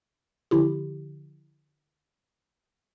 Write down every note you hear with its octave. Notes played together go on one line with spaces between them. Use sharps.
D3 F3 E4 G4